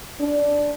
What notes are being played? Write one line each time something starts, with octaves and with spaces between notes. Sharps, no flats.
D4